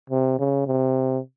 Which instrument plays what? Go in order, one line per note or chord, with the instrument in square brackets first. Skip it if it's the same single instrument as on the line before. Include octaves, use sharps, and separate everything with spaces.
[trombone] C3
C#3
C3